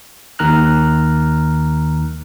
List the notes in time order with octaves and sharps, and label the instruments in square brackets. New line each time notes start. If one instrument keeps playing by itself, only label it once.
[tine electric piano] D#2 D#3 A#5 F6 F#6